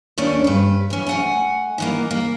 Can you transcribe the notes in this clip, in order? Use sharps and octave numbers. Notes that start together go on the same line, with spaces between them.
D#2 A3 C#4 D4
G2 B4
E3 C#4
A3 F#5 G#5
D#3 E3 A#3
A#3